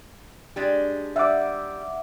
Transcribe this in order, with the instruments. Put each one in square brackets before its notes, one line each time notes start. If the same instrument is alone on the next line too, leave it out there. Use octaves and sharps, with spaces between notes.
[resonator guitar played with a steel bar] G#3 D4 G4
[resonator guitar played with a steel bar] G3 [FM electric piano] E5 F#5 D6